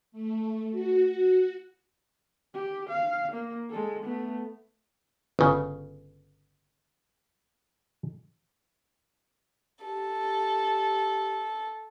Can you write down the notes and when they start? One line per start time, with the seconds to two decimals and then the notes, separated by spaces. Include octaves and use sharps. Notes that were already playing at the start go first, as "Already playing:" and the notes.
0.12 A3
0.71 F#4
2.54 G4
2.89 F5
3.32 A#3
3.70 G#3 A4
4.03 A3 B3
5.39 G1 C#3
9.84 G4 A4